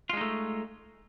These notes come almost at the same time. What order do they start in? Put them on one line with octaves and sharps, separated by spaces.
F4 G#3 D#4 A3